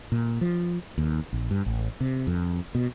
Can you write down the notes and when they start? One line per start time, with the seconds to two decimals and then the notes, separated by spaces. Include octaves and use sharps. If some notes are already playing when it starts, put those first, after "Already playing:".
0.12 A#2
0.41 F3
0.98 D#2
1.33 A#1
1.51 G2
1.66 A1
2.01 C3
2.27 F2
2.75 B2